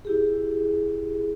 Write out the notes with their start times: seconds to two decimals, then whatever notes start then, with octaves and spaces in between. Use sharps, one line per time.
0.05 E4 G4 G#4